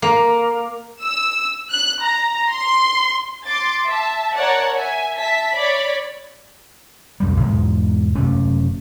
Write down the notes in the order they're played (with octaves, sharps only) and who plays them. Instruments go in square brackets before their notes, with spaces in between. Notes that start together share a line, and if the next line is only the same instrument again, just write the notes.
[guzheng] A#3
[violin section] E6
F#6
A#5
C6
C6 D6 A6
E5 A5
A#4 C#5 D5 F#5 A5
E5 G#5
E5 A5 B6
C#5 D5 B5
[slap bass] B1 F2 G3
E2 G#2 B2
F#1 C3 A3 C#4